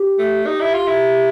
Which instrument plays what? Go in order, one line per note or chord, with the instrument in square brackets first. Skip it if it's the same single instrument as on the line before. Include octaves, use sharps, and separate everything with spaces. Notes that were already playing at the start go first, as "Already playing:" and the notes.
Already playing: [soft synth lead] G4
[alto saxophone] A3
[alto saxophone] D#4 [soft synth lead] G4
[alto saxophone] E4
F4
E4